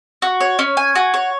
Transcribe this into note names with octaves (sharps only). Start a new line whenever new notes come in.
F#4
C#5
C#4
G#5
F#4
C#5